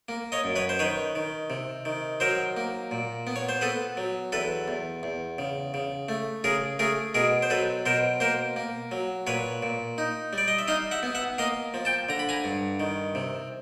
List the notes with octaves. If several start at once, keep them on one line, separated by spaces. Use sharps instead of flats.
A#3
C#5 D#5
F#2
B4 C#5
C5
D#3 B4 C#5
D#3
C3
D#3
F#3 A#4 C5
A#3
A#2
B3
C#5
C5
B3 A4 B4
F#3
E2 A4 B4
E2
E2
C#3
C#3
A3
C#3 G#4 A#4
A3 G#4 A#4
B2 G#4 A#4
C5
F#3 A4 B4
B2 A#4 C5
A#3 A#4 C5
A#3
F#3
A#2 B4 C#5
A#2
D#4
G3 D5
D#5
E5
D#4 D#5 F5
E5 F#5
B3
E5 F#5
A#3 D#5 F5
F3
G5 A5
D3 A#5
B5
G#5 A#5
G2
D#3
C3